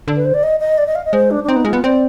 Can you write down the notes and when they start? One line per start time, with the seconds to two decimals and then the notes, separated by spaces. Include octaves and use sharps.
0.08 D3
0.16 B4
0.25 C5
0.34 D5
0.43 D#5
0.60 D#5
0.78 D5
0.87 D#5
0.95 F5
1.05 D#5
1.13 G#3 C5
1.31 D4
1.44 D4
1.48 C4 D#4
1.56 B3
1.65 G#3 F4
1.73 B3
1.84 C4 D5